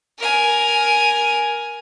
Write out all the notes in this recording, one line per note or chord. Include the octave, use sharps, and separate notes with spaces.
A#4 G#5